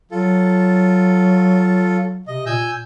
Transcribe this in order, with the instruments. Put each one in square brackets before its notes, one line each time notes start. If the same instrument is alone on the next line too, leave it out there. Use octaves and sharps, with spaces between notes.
[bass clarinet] F#3 [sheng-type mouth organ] F4 A4
[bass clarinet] C3 [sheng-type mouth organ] D#5
[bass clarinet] A#2 [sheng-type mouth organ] G#5 E6 G6